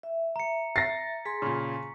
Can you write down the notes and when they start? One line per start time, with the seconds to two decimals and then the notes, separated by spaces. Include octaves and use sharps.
0.03 E5
0.36 A#5 C#7
0.76 A6 A#6 C7
1.25 G#4 G#5 C6 B6
1.42 A#2 C#3 C#6